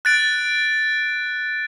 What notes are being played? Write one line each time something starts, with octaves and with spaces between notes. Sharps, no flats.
F#6 A6 D7